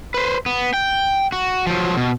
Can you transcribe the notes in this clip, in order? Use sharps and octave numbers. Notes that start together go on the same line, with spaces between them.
B4 C5
B3
G5
F#4
F3 F#3
B2